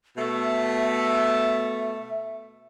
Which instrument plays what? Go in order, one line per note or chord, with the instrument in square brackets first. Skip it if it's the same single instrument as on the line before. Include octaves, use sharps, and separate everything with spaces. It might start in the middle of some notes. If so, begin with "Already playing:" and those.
[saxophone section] B2 A3 [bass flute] E5